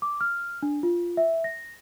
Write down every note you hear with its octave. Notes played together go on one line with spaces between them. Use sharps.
D6
F6
D4
F4
E5
A#6